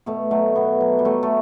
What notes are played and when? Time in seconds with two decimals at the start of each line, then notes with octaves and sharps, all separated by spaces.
0.06 B2 A3
0.31 F#3 A3
0.55 B2 B3
0.81 F#3
0.99 G3
1.05 F#3 A3
1.23 A3